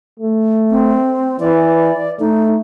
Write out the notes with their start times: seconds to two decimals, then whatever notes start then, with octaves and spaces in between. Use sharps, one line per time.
0.19 A3
0.71 C4
1.40 E3 D5
2.20 A3 D#4